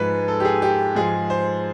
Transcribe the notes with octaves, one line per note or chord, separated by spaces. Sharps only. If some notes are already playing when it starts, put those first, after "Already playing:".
Already playing: G#2 F3 G#3 B4
A4
G4
G#4
G4
G#2 F3 G#3 G#4
C5